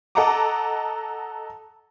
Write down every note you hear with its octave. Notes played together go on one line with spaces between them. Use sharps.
A4 D#5 F#5 A5 A#5 D6